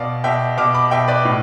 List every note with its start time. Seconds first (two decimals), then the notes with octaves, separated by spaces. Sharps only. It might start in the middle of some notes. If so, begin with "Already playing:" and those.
Already playing: B2 D5 F5
0.24 B2 E5 G5
0.57 B2 D6 F6
0.74 B5 D6
0.91 B2 E5 G5
1.08 B4 D5
1.25 A2